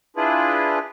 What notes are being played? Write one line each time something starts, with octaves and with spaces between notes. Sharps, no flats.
D4 E4 F4 G#4 B4